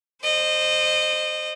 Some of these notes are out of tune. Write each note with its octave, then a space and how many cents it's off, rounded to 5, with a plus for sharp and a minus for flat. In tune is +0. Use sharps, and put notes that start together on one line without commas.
C5 +0 D#5 -25